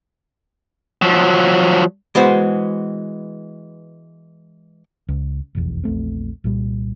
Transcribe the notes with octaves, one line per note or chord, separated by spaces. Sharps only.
F3 F#3
E3 G#3 B3 F#4 C5
C#2
F1 B1 E2
A#1 E2 A3 C4
C2 A#2 G3